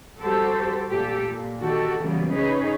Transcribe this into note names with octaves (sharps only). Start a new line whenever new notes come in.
G3 F#4 G4 A4 C5
A#2 G4 A4
A#2
D#3 F#4 G4 A4
C#3 E3 F#3 G3 A#3 B3
C#4 D#4 G#4 B4 C#5